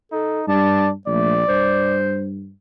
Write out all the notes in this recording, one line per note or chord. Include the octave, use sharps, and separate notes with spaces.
D#4 A4
G2 D5 A5
A#1 A3 D5
G2 C5